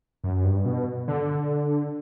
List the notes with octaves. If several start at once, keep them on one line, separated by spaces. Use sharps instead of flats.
F#2
G2
B2
D3